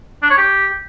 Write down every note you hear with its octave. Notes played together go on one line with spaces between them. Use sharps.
D4
C#5
G4